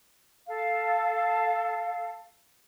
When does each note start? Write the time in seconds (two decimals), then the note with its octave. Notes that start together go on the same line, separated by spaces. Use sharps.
0.47 A4 F5